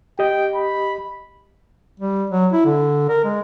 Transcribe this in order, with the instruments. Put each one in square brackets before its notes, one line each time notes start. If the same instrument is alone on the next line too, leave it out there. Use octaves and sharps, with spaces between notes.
[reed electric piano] G4 D#5 [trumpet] G5
[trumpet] B5
[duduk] G3
F#3
E4
D3
A#4
G#3